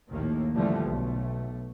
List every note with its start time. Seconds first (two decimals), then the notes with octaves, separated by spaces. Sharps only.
0.12 A#1 D#2 A2 D#3 A#3
0.55 A1 D3 E3 F3 G3 A3
0.85 B1 A3